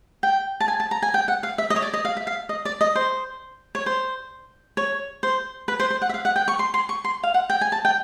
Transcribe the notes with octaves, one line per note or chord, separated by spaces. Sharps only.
G5
A5
G#5
A5
A#5
G#5
G5
F#5
F5
E5
D#5
C#5
D5
D#5
F5
E5
F5
D#5
D5
D#5
C5
C#5
C5
C#5
C5
B4
C5
C5
F#5
E5
F5
F#5
G5
C#6
C6
C6
C#6
C6
F5
F#5
G5
G#5
A5
G5